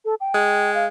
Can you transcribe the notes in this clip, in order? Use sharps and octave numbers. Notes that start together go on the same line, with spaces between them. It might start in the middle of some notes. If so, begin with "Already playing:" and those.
A4
G5
G#3
F5